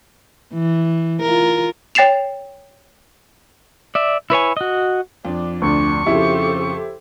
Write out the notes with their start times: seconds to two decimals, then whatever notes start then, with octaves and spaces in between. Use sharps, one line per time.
0.54 E3
1.22 F4 A#4
1.95 C#5 G5 A6 C7 E7 F7
3.95 D5 E5
4.30 E4 B4 C#5 G#5
4.57 F#4 D#5
5.25 F2 D4
5.62 D2 D4 C#6
6.07 F2 C#3 E4 G4 A4 C5